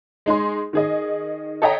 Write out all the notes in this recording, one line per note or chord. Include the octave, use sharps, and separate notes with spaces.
G#3 D#4 G#4 C6
D#3 G#4 D#5
A4 C#5 D#5 E5 G5 A#5